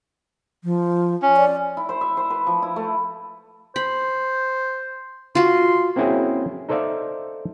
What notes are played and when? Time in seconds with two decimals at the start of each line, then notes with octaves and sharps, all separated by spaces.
0.64 F3
1.22 C#4
1.37 D5
1.77 E4
1.89 C5
2.01 E5
2.17 C5
2.30 B4
2.47 F3
2.62 E4
2.76 A3
3.76 C5 B5
5.35 F4 F#4 C6
5.96 A#3 C4 C#4 E4 F#4 G#4
6.69 D#4 A4 C5 D5 E5 F5